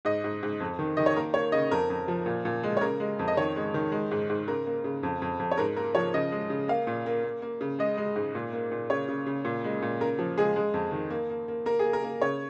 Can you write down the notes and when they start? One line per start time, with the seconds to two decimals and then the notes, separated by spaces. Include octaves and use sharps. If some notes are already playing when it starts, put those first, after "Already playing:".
0.05 G#2 D#5
0.24 G#2
0.43 G#2
0.60 F2
0.79 D#3
0.97 D#3 D#5
1.06 C#5
1.17 A#3 A#4
1.34 A#3 C#5
1.52 C#3 D#5
1.71 F2 A#4
1.90 F2
2.08 F3
2.26 A#2
2.45 A#2
2.63 G#3
2.77 C#5
2.81 C#3 A#4
3.00 G#3
3.19 F2
3.28 D#5
3.37 D#3 C#5
3.56 G#3
3.74 D#3
3.92 G#3
4.11 G#2
4.30 G#2
4.48 C#3 A#4
4.67 A#3
4.84 C#3
5.03 F2
5.22 F2
5.40 F2
5.51 C#5
5.58 G#2 A#4
5.76 A#3 A#4
5.95 F3 C#5
6.14 C#3 D#5
6.32 G#3
6.50 C#3
6.68 A#3 F5
6.87 A#2
7.06 A#3
7.24 A#3
7.42 A#3
7.61 C#3
7.79 G#3 D#5
7.97 G#3
8.16 G#2
8.35 A#2
8.53 A#3
8.72 A#2
8.90 C#3 C#5
9.08 C#3
9.26 C#3
9.45 A#2
9.64 G#3
9.82 A#2
10.00 C#3 A#4
10.19 F3
10.37 G#3 G#4
10.56 G#3
10.74 F2
10.92 D#3
11.10 A#3
11.30 A#3
11.48 A#3
11.66 A#3 A#4
11.79 G#4
11.85 A#3
11.93 A#4
12.03 A#3
12.22 C#3 C#5